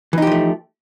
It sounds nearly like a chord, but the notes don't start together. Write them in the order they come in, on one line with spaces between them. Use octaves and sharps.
E3 D#4 G4 F3 A3